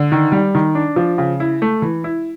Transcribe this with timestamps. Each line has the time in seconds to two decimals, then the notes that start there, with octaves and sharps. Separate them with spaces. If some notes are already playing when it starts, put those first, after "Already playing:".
Already playing: D3
0.12 D#3
0.32 G3
0.55 D#3
0.75 D4
0.96 F3
1.18 C#3
1.40 E4
1.62 A3
1.82 E3
2.04 E4